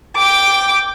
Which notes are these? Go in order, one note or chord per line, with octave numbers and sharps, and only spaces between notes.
G5 D6